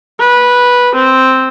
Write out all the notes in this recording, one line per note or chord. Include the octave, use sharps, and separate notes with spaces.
B4
C4